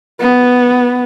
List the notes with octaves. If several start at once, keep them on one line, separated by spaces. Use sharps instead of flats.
B3